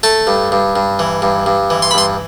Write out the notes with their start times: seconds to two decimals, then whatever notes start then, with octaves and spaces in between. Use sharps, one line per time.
0.03 A3 A5
0.27 G2
0.52 G2
0.76 G2
0.99 E3
1.22 G2
1.46 G2
1.70 E3
1.82 C6
1.91 B5
1.94 G2 C6